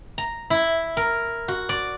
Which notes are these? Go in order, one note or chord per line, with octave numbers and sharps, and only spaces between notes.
A#5
E4
A#4
F#4
D5